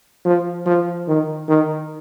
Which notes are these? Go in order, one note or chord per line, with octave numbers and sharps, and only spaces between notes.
F3
F3
D#3
D#3